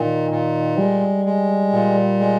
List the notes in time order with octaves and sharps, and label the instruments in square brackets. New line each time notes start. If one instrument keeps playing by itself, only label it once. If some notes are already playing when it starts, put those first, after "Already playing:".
Already playing: [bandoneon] A#2 [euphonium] D#3
[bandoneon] A#2
[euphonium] G3 [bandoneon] G#3
[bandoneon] G#3
A#2
G#3